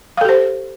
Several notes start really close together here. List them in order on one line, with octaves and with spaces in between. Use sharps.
F5 A4 G4 C5